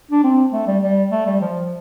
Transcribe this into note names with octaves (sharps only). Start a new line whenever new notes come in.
D4
C4
A3
G3
G3
A3
G3
F3